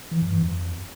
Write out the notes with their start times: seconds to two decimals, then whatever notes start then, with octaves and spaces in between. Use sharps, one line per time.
0.11 E3
0.22 G2
0.32 E3
0.43 F2